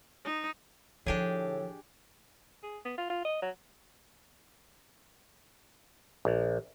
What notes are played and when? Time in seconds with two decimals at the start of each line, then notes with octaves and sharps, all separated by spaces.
0.25 D#4
1.06 A2 D3 F3 D4 G4 G#4
2.63 G#4
2.85 B3
2.98 F4
3.10 F4
3.25 D#5
3.42 F#3
6.25 A#1